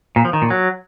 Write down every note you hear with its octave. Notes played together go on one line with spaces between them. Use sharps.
A#2
F3
D#3
A#2
F#3